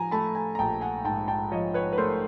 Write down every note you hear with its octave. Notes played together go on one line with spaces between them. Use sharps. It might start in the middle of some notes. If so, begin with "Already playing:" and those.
Already playing: F3 G#5 A#5
A3 A5 B5
G#5 A#5
A#5
A#1 G5 A5
F#5 G#5
G#2 G5 A5
G5 A5
F3 C#5 D#5
B4 C#5
B4
A3 A#4 C5